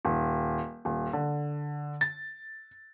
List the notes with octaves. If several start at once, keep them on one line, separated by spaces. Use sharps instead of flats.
D#1
D#1
D3
A6